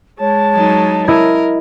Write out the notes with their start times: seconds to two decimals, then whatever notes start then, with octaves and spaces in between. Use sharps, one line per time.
0.20 G#3 C#5 A5
0.55 F#3 D#4
1.08 E4 A#4 D#5 G#6